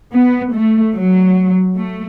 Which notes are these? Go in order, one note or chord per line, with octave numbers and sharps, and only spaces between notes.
B3
A3
F#3
A3